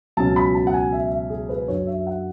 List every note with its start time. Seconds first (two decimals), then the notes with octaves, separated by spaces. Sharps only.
0.17 C#2 B2 F#3 C#4 A5
0.36 B5
0.55 A5
0.67 F#5
0.74 G#5
0.93 E5
1.11 E5
1.30 G#4
1.49 B4
1.68 F#2 D3 F#3 C#5
1.87 E5
2.07 F#5